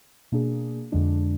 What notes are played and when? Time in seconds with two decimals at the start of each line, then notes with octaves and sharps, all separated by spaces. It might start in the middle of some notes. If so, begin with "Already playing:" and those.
0.32 B2 A#3 D4 G#4
0.92 F2 D3 G#3 D4